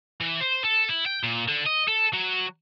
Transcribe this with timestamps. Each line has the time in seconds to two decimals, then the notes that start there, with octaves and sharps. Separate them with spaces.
0.21 E3
0.41 C5
0.64 A4
0.89 E4
1.06 G5
1.23 A#2
1.48 D3
1.66 D#5
1.88 A4
2.14 F#3